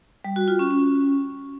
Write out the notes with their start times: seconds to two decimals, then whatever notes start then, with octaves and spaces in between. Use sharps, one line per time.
0.24 G3
0.36 F#4
0.48 F4
0.59 C#4
0.71 C#4